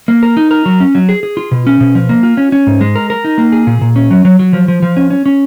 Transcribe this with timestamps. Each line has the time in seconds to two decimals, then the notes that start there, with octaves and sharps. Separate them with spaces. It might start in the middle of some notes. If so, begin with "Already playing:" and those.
0.08 A#3
0.23 A#4
0.37 D#4
0.51 A#4
0.66 F#3
0.80 C#4
0.95 F#3
1.09 G#4
1.23 G#4
1.37 F4
1.51 B2
1.67 C#4
1.80 B2
1.95 F3
2.09 A#3
2.23 F4
2.37 C#4
2.52 C#4
2.67 G#2
2.81 G#3
2.96 A#4
3.10 A#4
3.24 D#4
3.38 A#3
3.52 G#4
3.67 A#2
3.81 A#2
3.96 C#4
4.11 F#3
4.25 F#3
4.39 F#3
4.53 F3
4.68 F3
4.82 F3
4.97 C#4
5.10 C#4
5.26 C#4